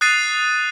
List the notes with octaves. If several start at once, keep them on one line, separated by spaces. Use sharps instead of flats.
D#6 F#6 A6 C7 D#7